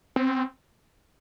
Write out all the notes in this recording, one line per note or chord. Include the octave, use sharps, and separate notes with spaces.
C4